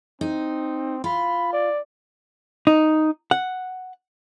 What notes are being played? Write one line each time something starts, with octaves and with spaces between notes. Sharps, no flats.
C4 D#4
F4 B5
D5
D#4
F#5